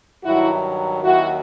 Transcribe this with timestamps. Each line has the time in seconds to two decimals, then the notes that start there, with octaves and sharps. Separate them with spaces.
0.24 G2 D#3 F#3 E4 F#4
1.03 D#2 D#3 F#3 E4 F#4